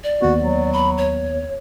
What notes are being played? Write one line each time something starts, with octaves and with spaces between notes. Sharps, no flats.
D5
D#2 B3 F#4
F#3
B5
C#5